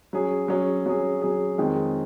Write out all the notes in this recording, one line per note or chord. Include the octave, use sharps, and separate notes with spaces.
F#3 C#4 G#4
F#3 C#4 G#4
F#3 C#4 G#4
F#3 C#4 G#4
F2 D#3 G#3